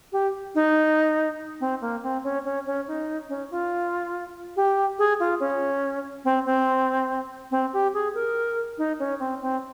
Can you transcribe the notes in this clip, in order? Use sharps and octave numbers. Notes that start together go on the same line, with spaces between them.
G4
D#4
C4
A#3
C4
C#4
C#4
C#4
D#4
C#4
F4
G4
G#4
F4
C#4
C4
C4
C4
G4
G#4
A#4
D#4
C#4
C4
C4